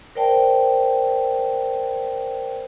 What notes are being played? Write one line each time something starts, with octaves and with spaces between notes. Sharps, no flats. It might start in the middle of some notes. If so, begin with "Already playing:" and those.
A#4 C5 D5 G5 A5